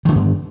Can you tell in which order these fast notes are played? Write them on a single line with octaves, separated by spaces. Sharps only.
D#3 D3 B3 G2